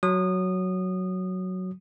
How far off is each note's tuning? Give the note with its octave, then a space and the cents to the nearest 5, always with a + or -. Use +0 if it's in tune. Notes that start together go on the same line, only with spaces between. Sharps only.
F#3 +0 D#6 -20